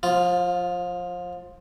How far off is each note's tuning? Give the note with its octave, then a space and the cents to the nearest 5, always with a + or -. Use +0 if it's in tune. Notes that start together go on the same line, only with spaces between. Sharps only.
F3 +30 F4 +0